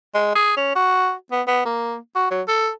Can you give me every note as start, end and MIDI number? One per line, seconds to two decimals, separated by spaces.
0.14 0.35 56
0.35 0.56 68
0.57 0.71 61
0.75 1.13 66
1.32 1.42 59
1.47 1.65 59
1.65 1.97 58
2.16 2.29 66
2.31 2.42 54
2.48 2.69 69